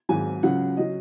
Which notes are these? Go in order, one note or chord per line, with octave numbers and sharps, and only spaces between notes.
G#1 G#2 F#3 G#5
C#2 C#3 F#3 F#5
C#3 F#3 D#5